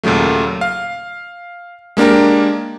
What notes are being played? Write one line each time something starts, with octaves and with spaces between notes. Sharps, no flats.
D#2 A#2 C#3 F#3 A3
F5
G#3 A#3 D4 G4 A#4